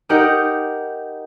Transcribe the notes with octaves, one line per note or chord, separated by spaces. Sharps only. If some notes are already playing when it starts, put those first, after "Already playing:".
D#4 G4 A#4 D#5 F#5